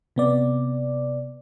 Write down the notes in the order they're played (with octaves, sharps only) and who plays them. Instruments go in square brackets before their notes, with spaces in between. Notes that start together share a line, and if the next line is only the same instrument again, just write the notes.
[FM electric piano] C3 B3 D5